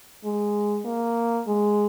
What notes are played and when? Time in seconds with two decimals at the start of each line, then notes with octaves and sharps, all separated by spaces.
0.24 G#3
0.85 A#3
1.48 G#3